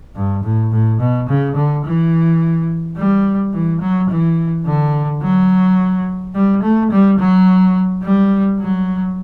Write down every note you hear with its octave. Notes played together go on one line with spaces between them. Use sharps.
G2
A2
A2
B2
C#3
D3
E3
G3
E3
F#3
E3
D3
F#3
G3
A3
G3
F#3
G3
F#3